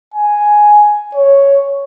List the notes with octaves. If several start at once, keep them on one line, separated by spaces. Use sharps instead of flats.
G#5
C#5